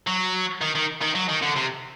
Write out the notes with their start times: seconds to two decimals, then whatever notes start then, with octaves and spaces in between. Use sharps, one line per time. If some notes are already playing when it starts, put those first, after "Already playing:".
0.07 F#3
0.61 D#3
0.75 D#3
1.02 D#3
1.15 F#3
1.29 D#3
1.42 D3
1.56 C3